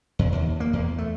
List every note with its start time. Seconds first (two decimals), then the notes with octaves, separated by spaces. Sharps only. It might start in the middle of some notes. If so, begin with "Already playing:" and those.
0.19 E2
0.32 D#2
0.60 A#3
0.73 E2
0.98 A3